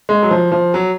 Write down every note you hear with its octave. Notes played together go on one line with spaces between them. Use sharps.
G#3
F#3
F3
F3
F#3